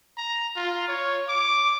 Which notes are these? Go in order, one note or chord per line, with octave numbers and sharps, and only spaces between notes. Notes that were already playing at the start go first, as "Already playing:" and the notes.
A#5
F4
C#5
D6